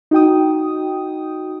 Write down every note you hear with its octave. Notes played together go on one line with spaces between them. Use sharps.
D#4 F#4 G5 D#6